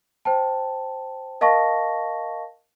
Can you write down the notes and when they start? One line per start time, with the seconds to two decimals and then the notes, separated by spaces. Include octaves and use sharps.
0.25 C5 G5 A5
1.41 A#4 D#5 F5 A5 C#6 A#6